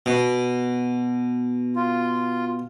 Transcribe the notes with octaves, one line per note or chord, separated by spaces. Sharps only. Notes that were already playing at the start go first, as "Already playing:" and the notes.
B2
F4